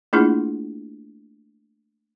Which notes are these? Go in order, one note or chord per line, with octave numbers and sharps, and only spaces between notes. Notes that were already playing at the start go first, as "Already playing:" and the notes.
A3 A#3 D4 E4 F4 G#4